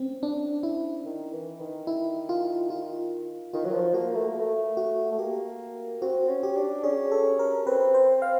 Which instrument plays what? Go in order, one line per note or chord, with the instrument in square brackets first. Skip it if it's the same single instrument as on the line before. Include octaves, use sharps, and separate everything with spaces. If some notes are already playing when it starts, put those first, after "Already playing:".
Already playing: [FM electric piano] C4 C#4
D4
E4
[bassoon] D#3
E3
D#3
[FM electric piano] E4
F4
F4
[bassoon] D#3 [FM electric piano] F4
[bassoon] F#3
F3
[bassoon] A#3 [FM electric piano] F#4
[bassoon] A3
A#3
A3
[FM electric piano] F#4
[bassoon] A3
[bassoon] A#3 [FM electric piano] G4
[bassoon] C4 [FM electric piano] F#4
[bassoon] C#4
[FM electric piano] G4
[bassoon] D4
[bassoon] C#4 [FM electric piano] G#4
[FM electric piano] A4
A#4
[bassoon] C4 [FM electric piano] B4
[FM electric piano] C5
F5